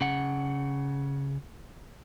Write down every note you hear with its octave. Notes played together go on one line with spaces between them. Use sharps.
C#3 F#5